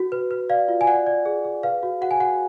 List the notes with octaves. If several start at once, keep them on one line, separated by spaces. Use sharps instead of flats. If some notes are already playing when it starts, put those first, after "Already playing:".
Already playing: F#4
B4
B4
D5 F5
F4
G#5
D5 F#5
D5
G#4
G#4
B4 F5
F#4
F#4 F#5
G#5
F#4 F#5